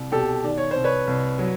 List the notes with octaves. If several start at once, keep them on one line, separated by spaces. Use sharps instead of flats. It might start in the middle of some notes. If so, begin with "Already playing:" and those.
Already playing: C2
B2 G4 A4
D#3 D5
C#5
C2 C5
B4 C#5
C2
F#3